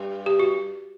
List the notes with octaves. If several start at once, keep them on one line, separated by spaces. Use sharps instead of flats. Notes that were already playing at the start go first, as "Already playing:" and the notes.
Already playing: G2 G3
G4
F#4